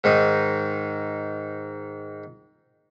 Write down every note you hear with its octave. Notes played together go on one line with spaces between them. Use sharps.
G#2 D#3 D#4 D#6